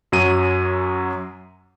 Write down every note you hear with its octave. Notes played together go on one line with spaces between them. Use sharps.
F#2 F#3 D#7